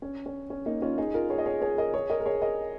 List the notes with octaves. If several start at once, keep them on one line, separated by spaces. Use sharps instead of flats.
C#4
C#4
C#4
A#3 D#4
C#4 F4
D#4 G#4
F4 A#4
G#4 C#5
D#5
G#4 C#5
G#4 C#5
A#4 D#5
G#4 C#5
A#4 D#5
A#4
G#4 C#5
A#4 D#5